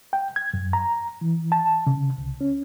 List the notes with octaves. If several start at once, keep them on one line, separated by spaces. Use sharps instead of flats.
G5
G#6
F#2
A#5
E3
A5
C#3
C2
C#4